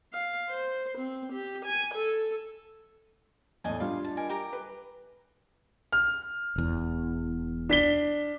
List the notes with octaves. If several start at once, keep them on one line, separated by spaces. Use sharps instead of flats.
F5
C5
C4
G4
G#5
A4
E2 A2 D#5 G#5 A5
G3 D4 F4 F5
A5
D#4 A#4 G#5
G4 A#4 A#5
B4
F6
E1 E2
D4 B6 G7